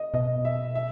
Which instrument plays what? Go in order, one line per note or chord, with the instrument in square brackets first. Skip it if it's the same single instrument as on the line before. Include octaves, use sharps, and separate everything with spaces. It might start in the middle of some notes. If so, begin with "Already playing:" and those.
Already playing: [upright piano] D#5
[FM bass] B2 [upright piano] D#5
[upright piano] E5
E5